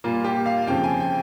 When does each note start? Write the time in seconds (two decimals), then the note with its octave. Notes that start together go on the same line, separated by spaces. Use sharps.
0.04 A#2 G3 A#3 F4
0.24 G4
0.46 F5
0.67 F2 C#3 F3 G5
0.84 G#5
1.00 G5